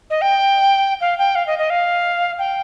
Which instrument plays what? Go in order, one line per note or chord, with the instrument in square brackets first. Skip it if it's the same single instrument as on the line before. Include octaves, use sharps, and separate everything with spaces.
[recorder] D#5
G5
F5
G5
F5
D#5
D#5
F5
G5